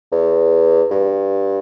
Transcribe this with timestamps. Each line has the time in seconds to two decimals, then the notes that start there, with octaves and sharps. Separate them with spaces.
0.12 E2
0.91 G2